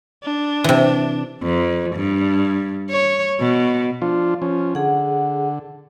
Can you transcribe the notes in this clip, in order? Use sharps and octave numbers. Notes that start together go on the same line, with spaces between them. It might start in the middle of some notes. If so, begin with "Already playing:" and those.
D4
C3 E3
F2
G2
C#5
B2
F3 D4 F4
F3 C#4
D3 G#4 F#5